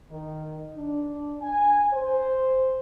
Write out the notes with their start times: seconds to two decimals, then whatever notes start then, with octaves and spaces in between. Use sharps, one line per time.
0.10 D#3
0.76 D4
1.41 G#5
1.93 C5